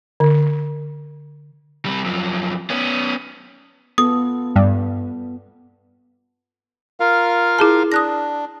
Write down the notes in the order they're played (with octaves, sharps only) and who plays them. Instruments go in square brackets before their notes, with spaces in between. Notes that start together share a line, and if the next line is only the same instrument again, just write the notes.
[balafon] D3
[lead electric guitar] G3 C4
F#2 F3
B3 C#4
[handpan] B3 F4 A4 [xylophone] D#6
[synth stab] G2
[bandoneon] F4 A#4 F5
[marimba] E4 G#4 A5
[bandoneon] D4 [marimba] D#6 F#6 A#6